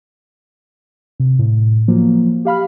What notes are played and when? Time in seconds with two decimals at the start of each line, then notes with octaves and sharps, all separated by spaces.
1.20 C3
1.39 A2
1.88 F3 F#3 A#3
2.45 G4 F5 B5 F6